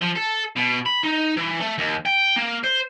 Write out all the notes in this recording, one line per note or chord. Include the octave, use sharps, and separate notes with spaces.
F3
A4
B2
B5
D#4
E3
A3
D#2
G5
A#3
C5